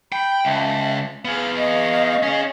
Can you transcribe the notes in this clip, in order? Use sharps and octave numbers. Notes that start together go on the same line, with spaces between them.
G5 B5 G6
C#2 E5 A5
B3 G#4 F5 F6
D#5 F5 C#6
C#4 G#4